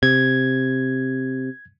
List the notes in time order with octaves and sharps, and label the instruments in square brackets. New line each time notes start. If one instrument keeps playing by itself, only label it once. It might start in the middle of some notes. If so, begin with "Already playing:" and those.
[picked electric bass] C3 [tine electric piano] G#6